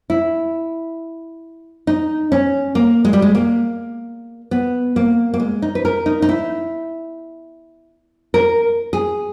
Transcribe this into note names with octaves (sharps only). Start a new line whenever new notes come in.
E4
D#4
C#4
A#3
G#3
G3
G#3
A#3
B3
A#3
A#3
G#3
D#4
B4
A#4
D#4
D#4
E4
A#4
G#4